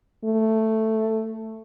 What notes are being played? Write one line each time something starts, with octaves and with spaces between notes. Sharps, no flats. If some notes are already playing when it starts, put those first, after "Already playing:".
A3